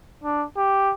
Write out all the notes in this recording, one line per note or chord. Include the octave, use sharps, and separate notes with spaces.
D4
G4